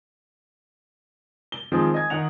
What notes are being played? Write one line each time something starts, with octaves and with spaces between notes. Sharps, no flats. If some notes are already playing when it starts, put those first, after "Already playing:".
G7
D#3 F3 G#3 C4 D#4
D#5 G#5 G#6
D#3 D#4 F#5 F7